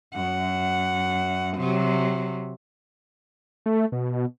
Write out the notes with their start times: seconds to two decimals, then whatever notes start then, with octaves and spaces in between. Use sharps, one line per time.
0.14 F#2 F#5
1.57 C3 F#3
3.66 A3
3.92 B2